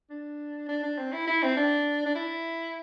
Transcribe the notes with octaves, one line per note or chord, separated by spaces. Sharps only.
D4
D4
D4
C4
E4
E4
C4
D4
D4
E4